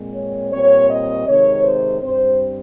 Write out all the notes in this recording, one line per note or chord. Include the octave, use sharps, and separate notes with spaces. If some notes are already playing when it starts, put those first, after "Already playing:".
Already playing: A#2 G#3 C4
C#5
A#2 G3 C4 C#5
D#5
C3 D#3 G#3 C#5
C5
G2 G3 C4 C5